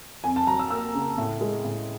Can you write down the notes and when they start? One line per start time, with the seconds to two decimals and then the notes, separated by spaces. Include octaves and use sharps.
0.24 F2 G#5
0.36 A5
0.47 F#3 A#5
0.59 E6
0.71 A#3 E6
0.94 C#3
1.18 A2
1.41 G#3
1.64 A2